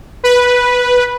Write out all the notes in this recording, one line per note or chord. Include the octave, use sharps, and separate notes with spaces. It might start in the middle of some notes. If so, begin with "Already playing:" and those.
B4